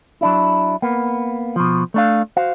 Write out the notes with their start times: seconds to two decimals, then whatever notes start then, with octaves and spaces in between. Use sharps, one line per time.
0.21 F#3 D4 E4
0.82 A#3 B3
1.56 B2 F3
1.94 A3 D4 F5
2.37 F#4 C5 F5